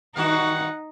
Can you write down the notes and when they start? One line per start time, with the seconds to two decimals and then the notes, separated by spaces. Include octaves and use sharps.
0.16 G2 D#3 D#4 F#4 F#5